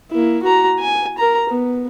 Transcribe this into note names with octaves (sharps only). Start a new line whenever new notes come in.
A#3 E4
F#4 A#5
G#5
A#4 A#5
B3